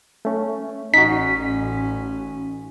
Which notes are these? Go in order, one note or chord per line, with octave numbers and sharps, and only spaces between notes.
A3 C#4
A1 C#4 D#4 F#4 B6